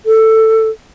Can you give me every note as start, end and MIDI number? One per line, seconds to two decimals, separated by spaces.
0.06 0.69 69